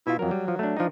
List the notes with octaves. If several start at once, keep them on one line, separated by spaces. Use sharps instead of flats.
B2 E4 F4
F2 F#3 A#4
G3
F3
A3 D4
F3 D4 D#4